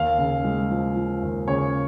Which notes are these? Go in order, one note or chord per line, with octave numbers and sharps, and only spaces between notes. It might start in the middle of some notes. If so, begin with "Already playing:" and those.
Already playing: D#2 F5
C#3
G#3
F3
F3
D#2
C#3 C#5